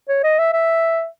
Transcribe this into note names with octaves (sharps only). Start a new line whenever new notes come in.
C#5
D#5
E5
E5